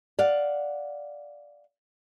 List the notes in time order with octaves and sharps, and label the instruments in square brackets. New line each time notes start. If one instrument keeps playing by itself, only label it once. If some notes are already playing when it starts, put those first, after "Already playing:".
[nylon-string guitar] D5 F5 F#5